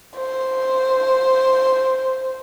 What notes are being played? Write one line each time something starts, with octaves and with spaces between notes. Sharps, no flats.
C5